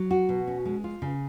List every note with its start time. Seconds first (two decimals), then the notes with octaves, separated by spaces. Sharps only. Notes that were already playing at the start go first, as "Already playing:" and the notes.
Already playing: F#3
0.11 F#4
0.29 B2
0.47 C#4
0.65 G#3
0.84 F4
1.02 C#3